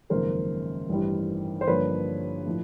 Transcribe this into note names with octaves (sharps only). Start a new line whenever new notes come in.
G#1 F#2 C#3 F3 A#3 A#4 C5
A1 G2 E3 G3
C5
G2 D3 F3 A#3 B4 C#5
A2 F3